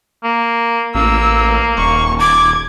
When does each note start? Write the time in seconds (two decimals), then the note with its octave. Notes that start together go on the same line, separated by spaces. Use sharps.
0.24 A#3
0.95 A1 A#3 E6
1.78 D#1 C#6
2.20 D6 G#6